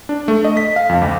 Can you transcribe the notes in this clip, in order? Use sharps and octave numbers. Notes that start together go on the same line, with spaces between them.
D4
A3
D#5
B6
F5
F2
D2